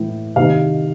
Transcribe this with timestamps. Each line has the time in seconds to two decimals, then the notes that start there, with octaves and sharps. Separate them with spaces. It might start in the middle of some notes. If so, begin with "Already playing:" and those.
Already playing: A2 E3
0.36 C3 D#3 F5